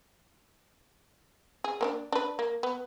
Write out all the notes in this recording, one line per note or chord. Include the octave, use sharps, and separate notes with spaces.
G#4
A#3 B3 D4
D4 B4
A#3
B3